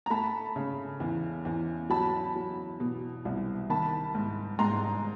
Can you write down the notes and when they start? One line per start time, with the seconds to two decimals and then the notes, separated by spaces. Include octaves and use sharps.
0.06 A#5
0.10 A3 A5 B5
0.56 C#3
1.00 E2
1.45 E2
1.90 F#3 A5 B5
2.36 F#3
2.80 B2
3.25 C2
3.70 D#3 A5 B5
4.15 G#2
4.59 G#2 A#5 C6